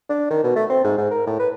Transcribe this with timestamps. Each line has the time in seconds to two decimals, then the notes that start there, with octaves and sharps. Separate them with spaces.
0.09 D4
0.30 D#3
0.44 B2
0.56 A3
0.70 C4
0.84 G#2
0.98 G#2
1.11 A#4
1.27 A2
1.39 B4